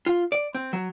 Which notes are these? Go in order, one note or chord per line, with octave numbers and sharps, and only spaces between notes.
F4
D5
C4
F#3